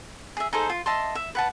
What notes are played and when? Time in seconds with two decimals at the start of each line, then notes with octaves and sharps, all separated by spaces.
0.37 G#4 E5
0.53 D#4 G#4 A4 C5
0.70 F4
0.86 D#5 E5 A5 C6
1.15 E5
1.35 B4 F#5 A5